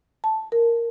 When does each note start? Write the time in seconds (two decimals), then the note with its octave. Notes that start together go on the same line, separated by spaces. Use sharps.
0.24 A5
0.52 A#4